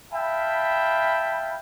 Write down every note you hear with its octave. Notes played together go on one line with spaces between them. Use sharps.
E5 F5 G5 A5 B5